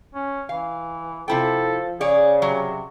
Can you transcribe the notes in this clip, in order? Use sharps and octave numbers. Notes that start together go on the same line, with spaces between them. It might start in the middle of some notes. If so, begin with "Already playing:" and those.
C#4
E3 F5
C3 F3 E4 A4 G5
C#3 G#4 C#5 D5
C3 F#3